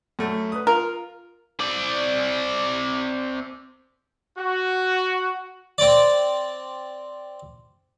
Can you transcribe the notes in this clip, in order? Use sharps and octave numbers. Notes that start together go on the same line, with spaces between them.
F#2 A3
B4 D#6
F4 A#4
C4 D5
F#4
C4 D5